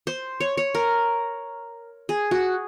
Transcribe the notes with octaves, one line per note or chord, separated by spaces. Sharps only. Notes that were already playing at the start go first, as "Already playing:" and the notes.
C5
C#5
C#5
A#4
G#4
F#4